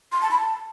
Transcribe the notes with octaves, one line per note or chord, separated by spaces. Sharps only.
C6
A5
B5
A5